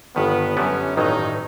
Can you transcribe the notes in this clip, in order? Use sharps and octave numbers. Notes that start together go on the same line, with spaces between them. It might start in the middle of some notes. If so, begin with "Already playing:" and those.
G1 G2 D#3 B3
F#2 D3 G3 B3 C#4
A1 G2 D#3 F#3 D#4